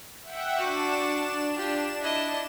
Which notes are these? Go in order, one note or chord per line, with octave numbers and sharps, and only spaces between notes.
E5 F#5 G5
D4 F#4 D6 E7
F4 G4
E4 D#5